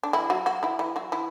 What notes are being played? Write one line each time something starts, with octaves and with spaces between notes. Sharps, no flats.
D4
E3 E4
F#3 F#4
F#3 F#4
E3 E4
E3 E4
F#3 F#4
E3 E4